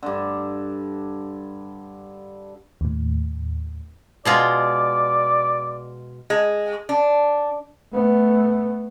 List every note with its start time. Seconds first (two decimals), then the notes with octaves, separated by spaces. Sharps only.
0.03 G2 D3
2.81 D#2 A2
4.25 B2 G#3 F4 D5
6.30 G#3
6.89 D4
7.93 A3 B3